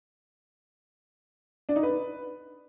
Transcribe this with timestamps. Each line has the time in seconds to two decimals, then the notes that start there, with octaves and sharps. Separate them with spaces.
1.69 D4
1.76 D#4
1.83 B4